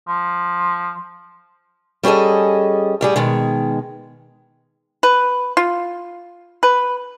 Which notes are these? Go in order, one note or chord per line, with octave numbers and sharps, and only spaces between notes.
F3
G3 C#4 G#4 A4 D#5
A2 G3 G#4
B2 D#3 G#3
B4
F4
B4